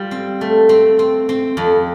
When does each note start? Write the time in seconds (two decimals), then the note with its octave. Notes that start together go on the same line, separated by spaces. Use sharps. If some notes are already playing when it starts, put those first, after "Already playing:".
Already playing: G3 F4
0.11 C4
0.41 A3
0.69 C4
0.99 C4
1.29 C4
1.57 F2